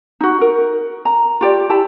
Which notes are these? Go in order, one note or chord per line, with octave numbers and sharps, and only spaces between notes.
D#4 F#4
A#4
A#5
F4 G4 D5
E4 G4 A5